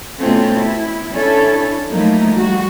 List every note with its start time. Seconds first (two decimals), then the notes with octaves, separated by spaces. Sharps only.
0.20 B2 A3 C4 C#4 F4 A4
0.57 E4
1.14 C#4 D4 E4 A4
1.91 F3 F#3 A3 A#3 D#4 E4
2.32 G3 F#4